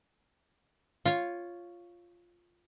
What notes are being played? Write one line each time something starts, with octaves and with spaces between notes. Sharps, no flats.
F4 C#5